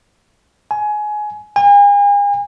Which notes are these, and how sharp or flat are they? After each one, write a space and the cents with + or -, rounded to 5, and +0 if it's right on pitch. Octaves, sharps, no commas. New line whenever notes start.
G#5 +20
G#5 -40